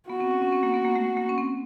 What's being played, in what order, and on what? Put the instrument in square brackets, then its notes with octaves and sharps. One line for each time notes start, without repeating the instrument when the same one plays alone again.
[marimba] B3 [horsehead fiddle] F#4
[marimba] C4
C#4
C#4
C4
A#3
B3
A#3
A3
A#3
C#4
C4